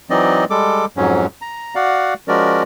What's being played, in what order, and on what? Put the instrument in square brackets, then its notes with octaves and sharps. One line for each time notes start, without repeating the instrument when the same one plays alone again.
[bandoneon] E3 F#3 C4 D#4 D5 D#5
G3 G#3 A4 D6
F2 G#2 F#3 C#4
A#5
F#4 D5 F5 F#5
F3 G#3 C#4 F#4 A#4 D5